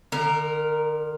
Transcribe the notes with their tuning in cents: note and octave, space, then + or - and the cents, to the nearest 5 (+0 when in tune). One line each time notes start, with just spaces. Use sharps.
D3 +45 A#4 +0